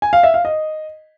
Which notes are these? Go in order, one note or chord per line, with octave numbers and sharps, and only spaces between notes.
G#5
F5
E5
F5
D#5